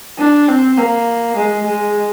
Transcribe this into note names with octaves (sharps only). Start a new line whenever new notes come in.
D4
C4
A#3
G#3
G#3